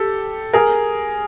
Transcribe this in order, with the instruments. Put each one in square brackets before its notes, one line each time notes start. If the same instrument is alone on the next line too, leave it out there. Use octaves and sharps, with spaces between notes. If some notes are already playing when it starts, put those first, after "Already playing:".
Already playing: [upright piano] G4 A4
G#4 A#4